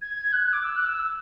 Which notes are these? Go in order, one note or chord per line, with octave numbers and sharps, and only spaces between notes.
G#6
F#6
D6
E6
F#6
E6